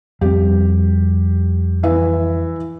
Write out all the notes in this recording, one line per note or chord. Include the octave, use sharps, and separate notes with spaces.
F2 G3 C4 G4
E3 E5